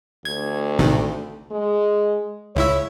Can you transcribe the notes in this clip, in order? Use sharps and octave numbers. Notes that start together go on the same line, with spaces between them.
D2 G#6
A1 C3 D#3
G#3
C#2 E4 C#5 E5